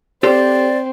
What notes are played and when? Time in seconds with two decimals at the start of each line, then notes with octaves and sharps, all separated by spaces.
0.23 C4 G4 A4 C5 D5